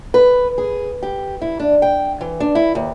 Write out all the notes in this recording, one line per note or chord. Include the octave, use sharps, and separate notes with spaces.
B4
G#4
G4
E4
D4
G5
E3
D4
E4
D#2